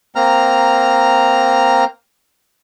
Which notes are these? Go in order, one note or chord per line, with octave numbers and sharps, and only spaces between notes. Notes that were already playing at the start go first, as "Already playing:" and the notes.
A#3 C4 A#5 F6